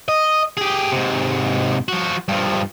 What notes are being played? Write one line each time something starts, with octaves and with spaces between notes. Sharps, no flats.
D#5
G4 G#4
G#2 C3
F3 F#4
G2 F3